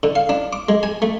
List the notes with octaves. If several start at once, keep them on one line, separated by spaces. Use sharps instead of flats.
D3
F5
D4
D6
G#3
G#5
A3